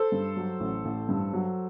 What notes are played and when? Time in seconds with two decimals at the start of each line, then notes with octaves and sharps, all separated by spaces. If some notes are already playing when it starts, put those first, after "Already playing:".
Already playing: A4 C5
0.12 G2
0.36 F#3
0.60 A1
0.85 A1
1.09 G2
1.33 F#3